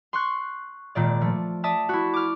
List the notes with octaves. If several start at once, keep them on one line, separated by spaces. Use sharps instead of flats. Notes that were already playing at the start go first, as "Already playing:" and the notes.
C6 C#6 F#6
G#1 A#2 D#3 D5
F3 A3
D5 E5 A5 D#6
E4 F#4
D6 F6